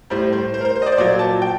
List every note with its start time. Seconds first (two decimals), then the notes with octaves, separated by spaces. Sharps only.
0.10 A2 G3 C5
0.33 C5
0.54 C5
0.61 A#4
0.65 C5
0.75 C5
0.82 D#5
0.86 D5
0.92 C5
0.97 A#2 F#3 D5
1.19 A5
1.42 G5